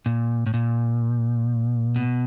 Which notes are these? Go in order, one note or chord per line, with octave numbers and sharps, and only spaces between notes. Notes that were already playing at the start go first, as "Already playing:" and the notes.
A#2
A2
A#2
B2